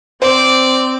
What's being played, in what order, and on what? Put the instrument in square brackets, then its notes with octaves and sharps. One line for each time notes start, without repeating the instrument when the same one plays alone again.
[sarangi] C4 [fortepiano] C5 [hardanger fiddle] D5